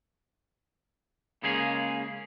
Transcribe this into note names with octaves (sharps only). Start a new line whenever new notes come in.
C#3 G#3 A#3 C#4 G#4